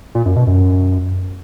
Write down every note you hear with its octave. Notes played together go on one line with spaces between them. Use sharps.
A#2
F#2
B2
F#2